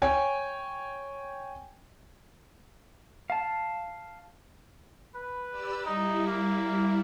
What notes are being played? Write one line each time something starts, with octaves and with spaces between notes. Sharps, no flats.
C#5 G5 G#5
F5 A5
B4
G4 D5 E6
G3 D#4 E4
A#3